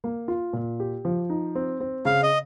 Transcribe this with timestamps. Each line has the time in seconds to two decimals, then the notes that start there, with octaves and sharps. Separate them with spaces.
0.04 A#3
0.28 F4
0.53 A#2
0.80 G4
1.05 F3
1.30 D#4
1.55 C4
1.80 C4
2.05 C#3 F5
2.23 D#5